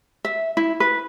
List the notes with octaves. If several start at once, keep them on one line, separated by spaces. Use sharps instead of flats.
E5
E4
B4